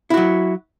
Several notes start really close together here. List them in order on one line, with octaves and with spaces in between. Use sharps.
E4 F#4 F#3